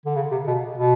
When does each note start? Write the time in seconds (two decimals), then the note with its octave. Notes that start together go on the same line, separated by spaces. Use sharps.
0.06 D3
0.15 C#3
0.32 C3
0.47 B2
0.78 B2